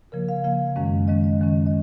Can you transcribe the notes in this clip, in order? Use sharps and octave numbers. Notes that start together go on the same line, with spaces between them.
C#3 F3 A#3 A#4
F5
C#3 F3 A#3 F5
F#2 D#3 G#3 C#4
F#2 D#3 G#3 C#4 D#5
D#5
F#2 D#3 G#3 C#4
D#5